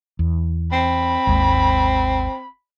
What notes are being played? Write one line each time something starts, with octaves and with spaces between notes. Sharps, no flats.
E2
C4 B5
G#1 D#2 G#3